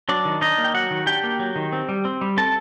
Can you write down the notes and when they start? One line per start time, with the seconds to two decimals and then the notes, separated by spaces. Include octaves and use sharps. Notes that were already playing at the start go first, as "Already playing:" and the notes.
0.09 F#3 D4 D5
0.25 D#3
0.41 D4 D#4 D#5
0.58 A#3
0.64 G5
0.74 F#3 F#4 F#5
0.91 D#3
1.06 D4 G4 G5
1.23 A#3
1.39 F#3
1.56 D#3
1.72 C4
1.89 G3
2.05 C4
2.21 G3
2.37 C4 A4 A5